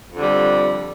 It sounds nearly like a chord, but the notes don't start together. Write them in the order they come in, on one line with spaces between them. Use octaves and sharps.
F2 D3 G3